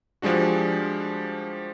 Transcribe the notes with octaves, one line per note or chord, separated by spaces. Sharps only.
F3 G3 G#3 D4 F#4